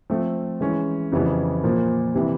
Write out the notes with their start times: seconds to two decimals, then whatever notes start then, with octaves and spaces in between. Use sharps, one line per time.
0.10 F3 A3 C4
0.61 E3 G#3 C#4
1.12 F2 C#3 E3 G3 B3
1.63 A#2 F3 A#3
2.15 C3 E3 G3